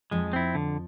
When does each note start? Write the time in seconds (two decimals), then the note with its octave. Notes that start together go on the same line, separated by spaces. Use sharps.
0.11 F2 F3 G#3
0.33 C4 E4
0.55 D3